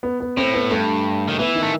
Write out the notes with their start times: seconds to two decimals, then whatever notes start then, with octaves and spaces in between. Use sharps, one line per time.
0.03 B3
0.20 B3
0.37 A2 C4
0.54 B3
0.70 G2 A3
1.28 D#3
1.39 E3 B3
1.56 D#3
1.63 A3